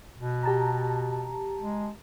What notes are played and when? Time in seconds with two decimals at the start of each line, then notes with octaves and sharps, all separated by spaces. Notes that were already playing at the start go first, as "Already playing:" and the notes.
0.19 B2
0.43 G4 A5 A#5
1.61 G#3